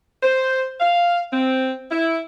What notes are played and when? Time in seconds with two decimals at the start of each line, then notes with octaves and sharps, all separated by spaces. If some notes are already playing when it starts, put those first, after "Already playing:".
0.23 C5
0.80 F5
1.32 C4
1.91 E4